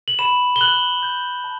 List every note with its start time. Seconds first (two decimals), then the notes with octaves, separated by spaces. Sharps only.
0.08 F#7
0.19 B5 E7
0.56 G7
0.61 F#6 F#7
1.03 G6
1.44 A5